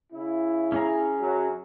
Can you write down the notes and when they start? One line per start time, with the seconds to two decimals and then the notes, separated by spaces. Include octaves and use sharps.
0.12 C#3 E4
0.72 C#4 G#4 A#5
1.20 F#2 F#3